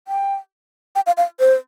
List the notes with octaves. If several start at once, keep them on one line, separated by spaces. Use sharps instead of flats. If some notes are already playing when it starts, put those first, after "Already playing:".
G5
G5
F5
F5
C5